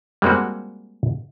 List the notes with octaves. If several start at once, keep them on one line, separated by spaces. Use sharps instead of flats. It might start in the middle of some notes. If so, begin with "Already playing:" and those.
G3 G#3 A#3 C4 F#4